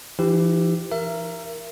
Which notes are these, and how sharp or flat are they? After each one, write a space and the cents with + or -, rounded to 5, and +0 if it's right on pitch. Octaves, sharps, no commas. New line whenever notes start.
E3 +45 D#4 +5 G4 +0
A#4 +0 E5 +30